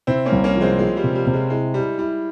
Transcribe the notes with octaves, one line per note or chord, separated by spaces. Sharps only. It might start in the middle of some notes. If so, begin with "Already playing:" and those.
C3 C4 E4
A#3 C#4
C2
A#3 C#4
F3
G#3 C4
F3 G#3
G3
C3
G3
C3
G#3
G#3 E4
G3 E4
G3 E4